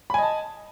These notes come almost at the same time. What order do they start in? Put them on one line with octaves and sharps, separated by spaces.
B5 G#5 D#5 A5